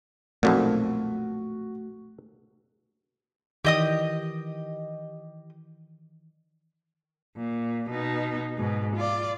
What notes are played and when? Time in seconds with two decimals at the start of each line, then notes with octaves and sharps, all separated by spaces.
0.43 B1 F2 A#2 A3 F#4
3.65 D#3 E3 G4 D5 D#5 D#6
7.37 A#2
7.90 B2 D#4
8.57 G#2 B2
8.96 F4 D5